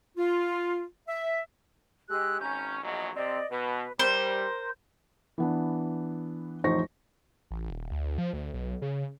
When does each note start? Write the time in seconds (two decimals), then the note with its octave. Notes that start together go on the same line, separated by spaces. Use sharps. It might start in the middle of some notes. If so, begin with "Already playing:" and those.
0.17 F4
1.08 E5
2.09 G#3 G4 E6 F#6
2.41 G#1 C#4 A#5 G6
2.83 A#1 E2 F#3 D#5
3.15 C3 C4 D5 D#5
3.51 B2 B4
3.99 G3 A#4 C5
5.38 E3 B3 D4
6.64 A1 F2 D#4 C5 C#6 A#6
7.51 A1
7.70 D#1
7.91 D2
8.18 F3
8.33 D2
8.54 B1
8.82 C#3